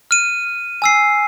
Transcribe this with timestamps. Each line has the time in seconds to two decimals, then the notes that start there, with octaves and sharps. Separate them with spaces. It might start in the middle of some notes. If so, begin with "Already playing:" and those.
0.11 F6 D#7
0.82 G#5 E6 C7